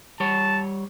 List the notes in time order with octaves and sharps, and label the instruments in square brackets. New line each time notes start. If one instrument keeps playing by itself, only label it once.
[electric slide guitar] G3 C#5 [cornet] A5